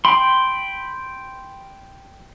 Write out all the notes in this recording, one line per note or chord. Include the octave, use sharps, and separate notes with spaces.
G5 B5 C6